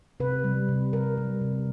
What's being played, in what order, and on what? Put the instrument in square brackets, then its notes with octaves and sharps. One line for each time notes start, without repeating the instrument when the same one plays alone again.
[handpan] C3 B4
G3
C3
C3 A#4
G3
C3